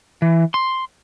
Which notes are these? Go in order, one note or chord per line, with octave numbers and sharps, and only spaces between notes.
E3
C6